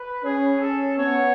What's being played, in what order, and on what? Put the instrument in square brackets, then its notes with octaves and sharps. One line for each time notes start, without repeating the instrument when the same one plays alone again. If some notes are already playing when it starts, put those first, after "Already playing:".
Already playing: [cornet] B4
[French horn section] C#4 [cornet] G#4
[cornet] A4
[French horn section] B3 [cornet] C#5